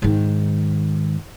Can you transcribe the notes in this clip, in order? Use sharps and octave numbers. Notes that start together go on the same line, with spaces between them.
G#2 D#3